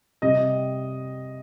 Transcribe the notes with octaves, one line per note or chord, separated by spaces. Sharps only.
C3 G3 D#5